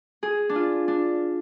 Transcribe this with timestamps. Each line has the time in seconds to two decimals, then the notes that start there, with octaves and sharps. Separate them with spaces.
0.23 G#4
0.49 D4
0.55 F4
0.88 D4